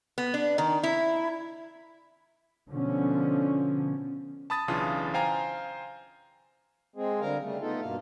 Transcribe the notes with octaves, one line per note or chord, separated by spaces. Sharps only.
B3
D4
D#3
E4
B2 D3 F3 C#4
A5 B5 D#6 A6
B1 C#3 E3 D4 F4 D#6
C5 F5 G5 G#5 A#5
G#3 C4 G#4
D3 G3 A#4 F5
C#3 G3 A3
A3 B3 D#4 F4 A4
G2 B2 A#3 F5